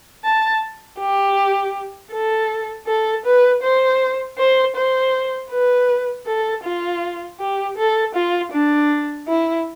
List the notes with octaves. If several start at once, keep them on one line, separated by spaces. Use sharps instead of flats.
A5
G4
A4
A4
B4
C5
C5
C5
B4
A4
F4
G4
A4
F4
D4
E4